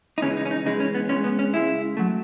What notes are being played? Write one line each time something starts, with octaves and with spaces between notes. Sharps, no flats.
D#4
C#2 C#3 E3 G#3 C#4
D#4
C#4
D#4
C#2 C#3 E3 G#3 D#4
C#4
B3
C#2 C#3 G#3 C#4
B3
C#4
C#2 C#3 G#3 E4
F#3 A3